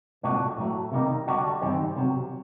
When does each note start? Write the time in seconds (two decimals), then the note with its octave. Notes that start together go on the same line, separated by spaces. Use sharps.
0.23 C2 A#2 A3 D4 F#4
0.58 A2 F#3 A3
0.92 C3 D#3 G3 A#3 D#4
1.27 D3 G3 D4 F#4
1.61 G2 D#3 G3 C4
1.96 C3 D#3 F#3